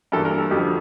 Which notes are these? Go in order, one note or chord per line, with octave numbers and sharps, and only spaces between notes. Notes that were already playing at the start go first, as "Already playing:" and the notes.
G2 E3 A#3 A4
A#4
A4
F2 D3 F3 G4